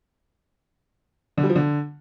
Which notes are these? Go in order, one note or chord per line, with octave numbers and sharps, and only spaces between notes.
D3
G3
F3
D3